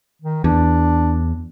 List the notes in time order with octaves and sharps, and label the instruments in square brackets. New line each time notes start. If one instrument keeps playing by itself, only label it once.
[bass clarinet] D#3
[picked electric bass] E2 [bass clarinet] D4